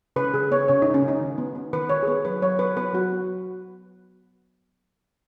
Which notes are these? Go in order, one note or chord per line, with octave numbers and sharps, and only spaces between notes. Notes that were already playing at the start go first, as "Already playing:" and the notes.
C#3 B4
C#3 G#4
B3 C#5
C#3 C#5
C#3 D#4
C#4
C#3
D#4
D#3
B3
B3
D#3 B4
D#3 C#5
G#4
B3 B4
F#3 B4
F#3 C#5
B3 B4
B3 B4
F#3 F#4
B3